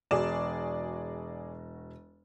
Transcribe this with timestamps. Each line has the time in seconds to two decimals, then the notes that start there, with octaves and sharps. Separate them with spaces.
0.11 E1 F#4 G#4 D5 E7